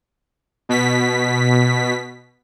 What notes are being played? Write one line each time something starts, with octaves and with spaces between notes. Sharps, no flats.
B2 B6